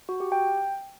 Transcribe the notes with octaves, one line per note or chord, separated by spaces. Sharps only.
F#4
G4
G5